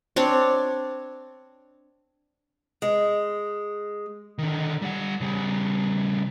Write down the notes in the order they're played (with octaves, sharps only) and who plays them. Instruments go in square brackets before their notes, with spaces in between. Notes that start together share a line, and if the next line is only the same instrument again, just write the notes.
[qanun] C4 D4 C#5
[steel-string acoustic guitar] G#3
[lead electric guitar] D3 D#3
G3 F#5
C#3 G3